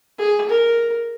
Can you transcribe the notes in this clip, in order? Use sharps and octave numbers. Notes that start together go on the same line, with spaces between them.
G#4
A#4